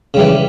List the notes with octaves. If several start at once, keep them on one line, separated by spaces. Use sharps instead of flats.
C#3 E3 G3